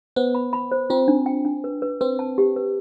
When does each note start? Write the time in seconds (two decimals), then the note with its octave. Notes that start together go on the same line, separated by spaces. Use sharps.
0.16 B3 C5
0.35 B5
0.53 B5
0.72 C5
0.90 C4 F4
1.08 D4
1.26 G5
1.45 D4
1.64 B4
1.82 B4
2.01 C4 B4
2.19 A5
2.38 G4
2.56 B4